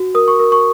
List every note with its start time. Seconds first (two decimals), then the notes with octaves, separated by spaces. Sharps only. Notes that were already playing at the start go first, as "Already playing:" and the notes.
Already playing: F#4
0.15 A#4 D#6
0.28 C#6
0.39 A#4
0.52 C#6